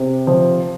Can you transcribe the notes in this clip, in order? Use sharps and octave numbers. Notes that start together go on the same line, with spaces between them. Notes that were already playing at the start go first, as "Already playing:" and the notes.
Already playing: C3
F3